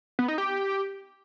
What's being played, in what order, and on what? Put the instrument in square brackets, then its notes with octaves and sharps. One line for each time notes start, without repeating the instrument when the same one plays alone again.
[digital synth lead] B3
D#4
G4